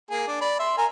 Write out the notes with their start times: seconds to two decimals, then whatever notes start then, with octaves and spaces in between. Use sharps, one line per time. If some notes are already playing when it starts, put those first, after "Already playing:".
0.11 A#3 G#4
0.27 D4
0.41 D5 B5
0.60 E5 C6
0.78 A#4 G#5 A#5